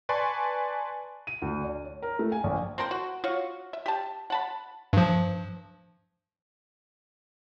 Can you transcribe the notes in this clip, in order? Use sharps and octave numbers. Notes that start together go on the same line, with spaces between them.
B4 D5 G#5 A5 C6 C#6
D#7
D2
D4
C#5
A#4
A3
G#5
A#1
C4 A4 A#4 C5
F#4
F4 F#4 C#5 C#6
E5
G4 A5
F#5 A5 B5
G2 F3